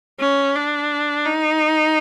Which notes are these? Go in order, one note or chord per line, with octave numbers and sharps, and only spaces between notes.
C#4
D4
D#4